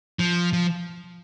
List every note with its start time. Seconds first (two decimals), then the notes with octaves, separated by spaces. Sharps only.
0.19 F3
0.53 F3